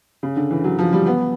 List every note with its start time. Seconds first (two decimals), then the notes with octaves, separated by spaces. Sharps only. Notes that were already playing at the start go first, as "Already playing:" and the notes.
0.23 C#3
0.36 D3
0.51 E3
0.64 F#3
0.79 F3
0.93 G3
1.06 B3